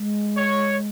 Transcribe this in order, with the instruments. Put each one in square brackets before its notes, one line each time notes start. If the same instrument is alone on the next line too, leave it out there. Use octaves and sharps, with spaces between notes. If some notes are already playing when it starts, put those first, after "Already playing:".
Already playing: [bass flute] G#3
[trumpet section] C#5